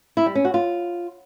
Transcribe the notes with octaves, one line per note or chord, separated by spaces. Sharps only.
E4
G3
C#4
F#4
F4